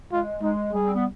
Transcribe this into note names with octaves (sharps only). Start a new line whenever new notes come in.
G#3 F4
G#3 D#4
G3 G#4
C4
B3